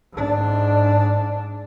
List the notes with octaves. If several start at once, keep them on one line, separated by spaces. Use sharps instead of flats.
G#2 D4